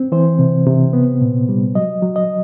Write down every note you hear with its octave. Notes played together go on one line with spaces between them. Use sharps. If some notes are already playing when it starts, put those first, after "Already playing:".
Already playing: C4
E3 C5
C3
C3
B3
A#2
G3
F#3 D#5
F#3
D#5